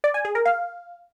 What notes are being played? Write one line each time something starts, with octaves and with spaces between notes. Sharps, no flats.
D5
G#5
G#4
A#4
F5